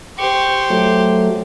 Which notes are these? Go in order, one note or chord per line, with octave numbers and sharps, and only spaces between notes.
G4 C5 C#6
F#3 A3